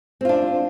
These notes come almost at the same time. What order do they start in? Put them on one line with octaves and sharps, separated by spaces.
C4 F4 D4